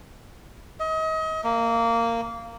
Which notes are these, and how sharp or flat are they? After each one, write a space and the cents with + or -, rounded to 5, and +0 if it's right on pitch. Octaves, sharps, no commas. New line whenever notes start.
D#5 +35
A#3 -15